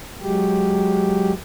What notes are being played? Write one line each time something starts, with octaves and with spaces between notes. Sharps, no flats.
F#3 G#3 G4